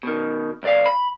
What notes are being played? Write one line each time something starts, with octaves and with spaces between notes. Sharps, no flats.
B2 D#3
C2 D5 F5
B5